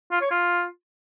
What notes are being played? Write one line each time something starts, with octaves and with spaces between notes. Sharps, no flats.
F4
C#5
F4